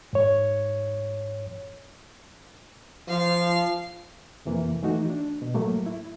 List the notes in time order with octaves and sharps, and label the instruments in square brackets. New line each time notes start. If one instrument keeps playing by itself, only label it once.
[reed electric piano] G#2 C#5
[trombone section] F3 [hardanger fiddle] F5
[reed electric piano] F2 C3 E3 A#3
E3 A3 D#4 F#4
D4
B2
A2 F#3 A3 A#3
E4